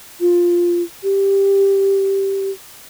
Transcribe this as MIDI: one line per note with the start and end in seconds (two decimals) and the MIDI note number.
0.21 0.82 65
1.03 2.50 67